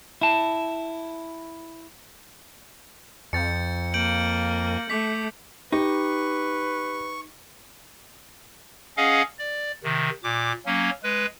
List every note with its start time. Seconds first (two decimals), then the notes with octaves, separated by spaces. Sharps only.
0.21 E4 A5
3.33 F2 G6 A6 C#7
3.94 A#3 G6 D7 F#7
4.90 A3 D6 B6
5.73 D#4 G4 B4 C#6
8.97 C#4 G#4 D#5 F5 F#5
9.39 D5
9.84 C3 D#3
10.24 A#2 D6
10.66 F#3 A#3 C#4
11.03 G#3 B4